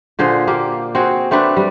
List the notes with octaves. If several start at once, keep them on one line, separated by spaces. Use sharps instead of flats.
A#2 D3 G#4 C5
A#3 G4
C4 F#4 G#4
A3 C4 D4 B4
G3